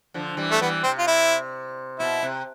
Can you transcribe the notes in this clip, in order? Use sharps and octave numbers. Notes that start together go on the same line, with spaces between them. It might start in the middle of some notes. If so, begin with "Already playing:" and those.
D3 F3
E3 G3
A3
E3 G3 B3
C3 C4
F4
E4
B2 E4
C3